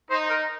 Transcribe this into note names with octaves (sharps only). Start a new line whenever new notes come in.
D#4 C5
A#4